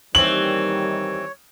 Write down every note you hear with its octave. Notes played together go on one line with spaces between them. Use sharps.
D#2 D#3 E3 G3 C4 C#5 F#7